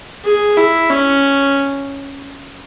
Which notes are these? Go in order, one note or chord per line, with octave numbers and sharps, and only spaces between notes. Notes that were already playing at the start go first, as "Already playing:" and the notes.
G#4
E4
C#4